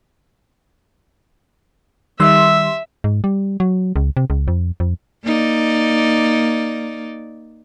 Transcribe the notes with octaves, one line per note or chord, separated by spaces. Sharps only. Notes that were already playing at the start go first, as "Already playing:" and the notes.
D#3 G3 E5 C6 E6
G#2
G3
F#3
C#2
C3
C#2
F2
F2
A#3 D#4 D5